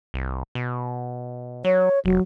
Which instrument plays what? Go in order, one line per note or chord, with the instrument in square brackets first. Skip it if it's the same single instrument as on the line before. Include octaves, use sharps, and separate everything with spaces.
[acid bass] C2
B2
[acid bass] F#3 [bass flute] C#5
[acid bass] F1 [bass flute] F#3